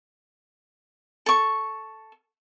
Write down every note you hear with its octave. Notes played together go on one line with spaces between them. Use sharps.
A4 C#6